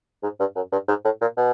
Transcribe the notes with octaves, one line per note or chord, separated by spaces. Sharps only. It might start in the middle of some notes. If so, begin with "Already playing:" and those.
G#2
G2
F#2
G2
G#2
A2
A#2
B2